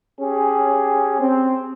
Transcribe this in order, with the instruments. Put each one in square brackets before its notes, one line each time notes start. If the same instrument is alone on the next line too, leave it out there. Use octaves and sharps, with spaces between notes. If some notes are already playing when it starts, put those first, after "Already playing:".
[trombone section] C#4 G4 G#4
C4